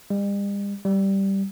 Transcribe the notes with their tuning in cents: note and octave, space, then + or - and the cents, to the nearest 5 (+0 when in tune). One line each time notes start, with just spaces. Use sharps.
G3 +45
G3 -5